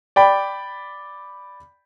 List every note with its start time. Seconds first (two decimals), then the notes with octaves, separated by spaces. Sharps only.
0.16 D5 G5 B5